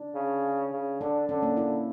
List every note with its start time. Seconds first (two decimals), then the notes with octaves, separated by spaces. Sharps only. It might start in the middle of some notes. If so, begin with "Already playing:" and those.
Already playing: D4
0.15 C#3
0.72 C#3
1.00 D3 D4
1.29 D3 C#4
1.42 A#3
1.57 E4